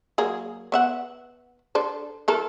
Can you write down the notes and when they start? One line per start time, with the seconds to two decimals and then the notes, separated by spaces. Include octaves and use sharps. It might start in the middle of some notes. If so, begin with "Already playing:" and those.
0.18 F#3 A#3 G#4
0.72 B3 E5 F#5
1.75 D4 A4 C5
2.28 E3 A4 A#4